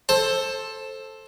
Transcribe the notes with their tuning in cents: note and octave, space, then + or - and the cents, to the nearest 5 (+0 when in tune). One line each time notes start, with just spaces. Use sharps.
A4 +0 C5 +20